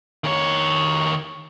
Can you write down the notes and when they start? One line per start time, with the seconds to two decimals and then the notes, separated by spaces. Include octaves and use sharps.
0.24 D#3 C#5